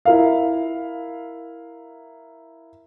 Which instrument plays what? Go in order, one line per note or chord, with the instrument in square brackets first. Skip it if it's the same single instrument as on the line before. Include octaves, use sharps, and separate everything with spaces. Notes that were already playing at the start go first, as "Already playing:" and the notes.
[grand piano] E4 A#4 F5